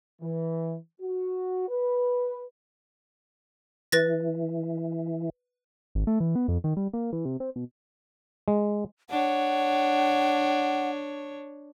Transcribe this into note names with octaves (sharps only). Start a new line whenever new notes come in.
E3
F#4
B4
E3 B4 A6 A#6
G#1
A3
E3
B3
F2
D#3
G3
A#3
E3
C3
C4
B2
G#3
D4 C#5 F#5